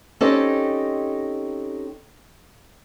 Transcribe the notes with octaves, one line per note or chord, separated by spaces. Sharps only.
C4 C#4 D#4 G4 A4 D#5